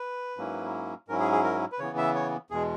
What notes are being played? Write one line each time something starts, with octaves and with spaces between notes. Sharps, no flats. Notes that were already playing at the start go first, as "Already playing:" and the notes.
Already playing: B4
G#2 F#3 A#3 C#4 E4
G#2 F#3 C#4 E4 A#4
G#4
G#4
A#4
B4
C#3 E3 B3 C#5
E5
C#5
E2 B2 G#3 G#4